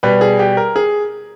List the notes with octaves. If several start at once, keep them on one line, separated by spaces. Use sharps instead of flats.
B2 G3 B4
G#4
G4
A#4
G#4